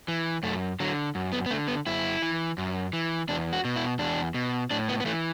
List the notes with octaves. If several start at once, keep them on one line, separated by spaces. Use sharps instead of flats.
E3
F#2 A3
D3 F#3
F#2
B3
B3
D3 A3
B3
F#2 E4
E3
F#2
E3
E2 D4
F#4
B2
E4
E2 D4
B2
A2 D4
B3
B3
E3 A3